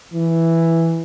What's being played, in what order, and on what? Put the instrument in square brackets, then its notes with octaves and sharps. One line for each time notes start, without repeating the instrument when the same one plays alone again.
[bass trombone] E3